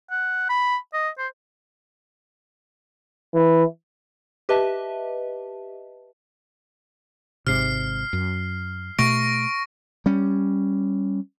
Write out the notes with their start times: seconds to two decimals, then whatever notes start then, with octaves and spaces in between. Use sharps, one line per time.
0.11 F#5
0.49 B5
0.94 D#5
1.18 C5
3.35 E3
4.49 G4 B4 D#5 E5 A5
7.47 G#1 G#2 C3 F6 C7
8.13 F#2
8.99 B2 A3 C#6 A#6 D7
10.06 G3 C#4